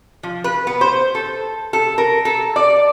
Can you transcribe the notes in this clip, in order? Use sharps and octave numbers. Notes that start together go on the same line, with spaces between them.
F3
B4
B3
C5
A4
A4
A#4
A4
D5